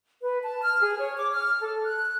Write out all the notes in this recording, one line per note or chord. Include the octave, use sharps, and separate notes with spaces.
B4
A5
F6
G#4
C#5
D6
F6
A4
F#6